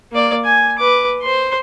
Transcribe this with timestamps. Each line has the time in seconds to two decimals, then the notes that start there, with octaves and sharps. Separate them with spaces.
0.12 A#3 D5
0.45 G#5
0.79 B4 D6
1.22 C5 C6